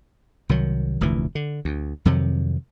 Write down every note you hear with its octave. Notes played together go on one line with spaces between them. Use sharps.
C2 D#3 F#3
F1 D2 A#2 E3
D3
D2
F2 C3 D#3 F#3